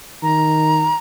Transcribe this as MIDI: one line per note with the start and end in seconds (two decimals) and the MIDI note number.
0.23 0.92 51
0.23 0.97 82